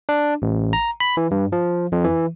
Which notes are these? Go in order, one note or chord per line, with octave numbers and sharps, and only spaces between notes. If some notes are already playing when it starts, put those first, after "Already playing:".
D4
A1
A#5
B5
E3
G2
F3
F2
E3